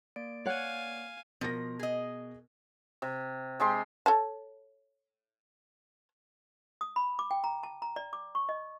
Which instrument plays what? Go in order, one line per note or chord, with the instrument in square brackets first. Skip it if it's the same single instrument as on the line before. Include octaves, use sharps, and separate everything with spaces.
[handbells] A#3 D5 D7
[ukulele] C#5 F#5 [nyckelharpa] F5 G#5
[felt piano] B2 A#4 A#6 [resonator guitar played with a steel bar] F3
[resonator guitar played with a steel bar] G#4 D#5
[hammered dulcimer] C3
C3 G#3 G4 C6
[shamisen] A4 C#5 A5
[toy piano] D#6
B5
D6
G5
A#5
A5
A#5
D5
D6
C#6
D#5